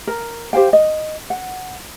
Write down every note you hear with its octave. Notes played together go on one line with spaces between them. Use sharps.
A#4
G4 C5 F5 G5
D#5
F#5